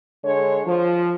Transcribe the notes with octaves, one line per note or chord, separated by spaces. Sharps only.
D3 G#3 C#5
F3